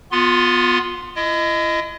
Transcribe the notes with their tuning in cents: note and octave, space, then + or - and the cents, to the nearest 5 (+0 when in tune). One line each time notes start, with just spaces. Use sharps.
B3 +0 F4 +30 C6 +0
E4 +40 D#5 +0